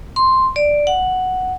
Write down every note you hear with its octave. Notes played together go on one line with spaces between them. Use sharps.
C6
D5
F#5